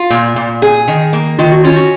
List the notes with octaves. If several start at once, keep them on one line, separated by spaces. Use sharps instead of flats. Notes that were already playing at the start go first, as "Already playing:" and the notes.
Already playing: F4
A#2
A#2
G#4
D#3
A#3
D#3 F4
F#4
C#4 F4
F#4